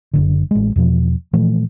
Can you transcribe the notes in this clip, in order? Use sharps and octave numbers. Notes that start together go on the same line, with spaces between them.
F#1 B1 D3
A1 G#3
E2 B2 F3
A#2 E3 F3 A3